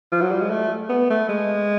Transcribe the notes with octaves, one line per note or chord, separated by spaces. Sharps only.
F3
F#3
G3
G#3
A3
B3
A3
G#3